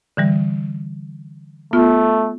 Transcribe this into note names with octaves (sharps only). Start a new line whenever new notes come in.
D3 E3 G3
A3 B3 F4